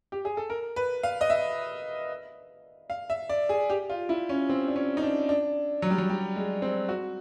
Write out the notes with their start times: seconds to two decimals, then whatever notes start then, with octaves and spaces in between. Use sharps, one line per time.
0.12 G4
0.25 G#4
0.37 A4
0.50 A#4
0.76 B4
1.03 F5
1.21 D#5
1.30 E5
2.90 F5
3.10 E5
3.29 D5
3.49 G#4
3.70 G4
3.90 F4
4.09 E4
4.29 C#4
4.49 C4
4.68 D4
4.76 C#4
4.97 D#4
5.03 D4
5.29 D4
5.82 F#3
5.90 G3
5.98 F#3
6.10 G3
6.36 G#3
6.62 C4
6.89 F#4